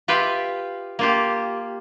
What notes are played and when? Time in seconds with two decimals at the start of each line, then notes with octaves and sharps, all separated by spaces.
0.08 F4 G4 B4 E5 G5
0.99 A#3 F4 G4